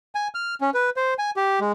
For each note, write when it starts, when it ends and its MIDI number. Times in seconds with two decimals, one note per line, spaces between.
0.15 0.28 80
0.35 0.55 89
0.61 0.70 61
0.74 0.90 71
0.97 1.14 72
1.19 1.31 80
1.37 1.59 67
1.60 1.72 56